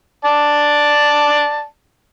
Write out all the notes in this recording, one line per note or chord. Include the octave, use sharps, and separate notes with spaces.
D5 A5